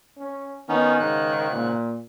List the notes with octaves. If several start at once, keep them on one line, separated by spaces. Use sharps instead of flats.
C#4
D#3 B3 C#4 D#4
G#2 C#3 F#6
A#2